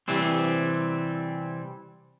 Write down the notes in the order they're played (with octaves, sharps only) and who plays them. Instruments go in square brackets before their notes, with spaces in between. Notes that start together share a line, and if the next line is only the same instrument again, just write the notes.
[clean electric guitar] C3 E3 G3 C4